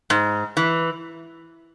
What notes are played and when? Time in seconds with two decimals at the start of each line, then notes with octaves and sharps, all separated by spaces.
0.10 G#2
0.57 E3